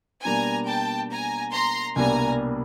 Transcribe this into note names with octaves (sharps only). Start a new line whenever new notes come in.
B2 G3 A#3 D4 G#5 A#5
G5 A5
G#5 A#5
A#5 C6
C2 B2 G3 A#3 D4 G#5 A#5